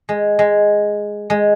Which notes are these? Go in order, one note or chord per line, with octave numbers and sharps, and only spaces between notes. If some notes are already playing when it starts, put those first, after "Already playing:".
G#3
G#3
G#3